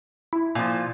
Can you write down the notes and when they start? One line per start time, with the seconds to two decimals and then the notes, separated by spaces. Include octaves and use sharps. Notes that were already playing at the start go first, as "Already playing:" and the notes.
0.33 E4
0.55 A#2 F3